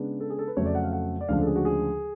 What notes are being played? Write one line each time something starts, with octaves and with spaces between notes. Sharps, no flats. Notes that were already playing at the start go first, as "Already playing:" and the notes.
Already playing: C#3 G#3 B3 D4
A4
G#4
A4
B4
F2 C#3 F#3 A3 C#5
D5
F#5
F5
F#5
D5
D2 C#3 F3 G#3 D4 F5
A4
G#4
F#4
G#4